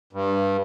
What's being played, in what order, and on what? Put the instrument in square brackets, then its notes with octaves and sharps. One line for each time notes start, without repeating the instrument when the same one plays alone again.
[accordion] G2